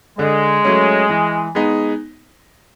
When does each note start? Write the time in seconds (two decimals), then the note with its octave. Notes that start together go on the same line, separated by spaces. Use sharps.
0.18 D3 G#3
0.64 F#3 A3 C#4
1.09 E3
1.55 G#3 B3 D#4